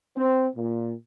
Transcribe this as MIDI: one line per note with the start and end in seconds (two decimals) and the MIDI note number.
0.17 0.47 60
0.57 0.92 46